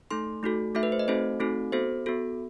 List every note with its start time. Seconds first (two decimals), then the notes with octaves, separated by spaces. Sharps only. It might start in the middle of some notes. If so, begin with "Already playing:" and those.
0.11 A3 D#4 A4 C6
0.43 A3 D#4 F#4 A4
0.75 A3 D#4 F#4 A4 E5
0.83 B4
0.92 C5
0.99 D#5
1.08 A3 C4 D#4 F#4 A4 C5
1.40 A3 C4 D#4 F#4 A4
1.72 B3 F#4 A4 C5
2.06 B3 F#4 A4